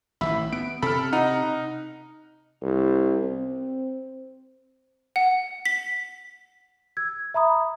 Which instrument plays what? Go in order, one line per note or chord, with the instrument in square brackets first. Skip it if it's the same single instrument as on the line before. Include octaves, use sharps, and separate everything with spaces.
[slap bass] A1 D#3 E3 [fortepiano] E5 [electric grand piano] B5
[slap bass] B3 [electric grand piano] D7
[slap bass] C3 [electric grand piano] A4 F6 [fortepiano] B5
[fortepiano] D#4 [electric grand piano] F#5 A#5
[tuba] C2
C4
[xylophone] F#5
B6
[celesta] E6 G#6
E5 A#5 B5 D#6